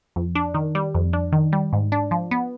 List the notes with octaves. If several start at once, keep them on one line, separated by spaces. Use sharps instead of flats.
F2
D4
D#3
G3
F2
D4
D#3
G3
G#2
D4
F3
B3